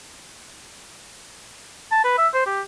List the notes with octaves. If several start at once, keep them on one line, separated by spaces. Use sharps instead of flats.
A5
B4
E5
C5
G4